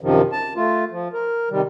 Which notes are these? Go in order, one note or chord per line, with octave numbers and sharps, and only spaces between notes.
F#2 C3 D#3 F3
A5
A3 F4
F3
A#4
C3 D#3 G3